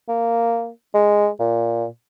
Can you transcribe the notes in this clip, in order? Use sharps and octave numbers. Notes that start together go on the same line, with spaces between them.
A#3
G#3
A#2